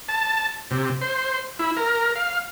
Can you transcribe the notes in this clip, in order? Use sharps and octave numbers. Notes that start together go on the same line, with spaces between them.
A5
C3
C5
E4
A#4
F5